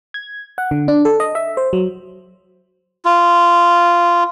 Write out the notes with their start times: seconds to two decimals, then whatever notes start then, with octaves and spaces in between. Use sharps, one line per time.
0.14 G#6
0.58 F#5
0.71 D3
0.88 D4
1.05 A4
1.20 D#5
1.35 E5
1.57 C5
1.73 F#3
3.05 F4